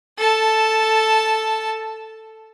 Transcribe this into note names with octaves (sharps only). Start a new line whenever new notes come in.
A4 A5